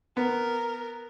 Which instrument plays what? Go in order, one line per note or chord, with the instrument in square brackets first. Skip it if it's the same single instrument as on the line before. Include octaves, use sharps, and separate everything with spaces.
[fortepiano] B3 [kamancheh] A#4